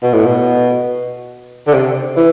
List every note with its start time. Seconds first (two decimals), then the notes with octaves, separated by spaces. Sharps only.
0.03 B2
0.14 A2
0.26 B2
1.67 D3
1.74 C3
2.17 E3